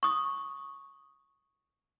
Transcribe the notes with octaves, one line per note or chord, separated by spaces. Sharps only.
C#6 D#6